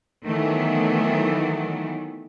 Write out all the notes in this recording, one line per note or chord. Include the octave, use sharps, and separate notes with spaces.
D#3 E3 F#3 A3 B3